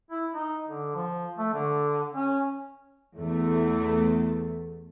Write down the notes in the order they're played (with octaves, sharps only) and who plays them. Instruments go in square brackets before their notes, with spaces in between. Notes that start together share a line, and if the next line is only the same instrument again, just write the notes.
[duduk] E4
D#4
D3
F3
A3
D3
C#4
[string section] E2 A3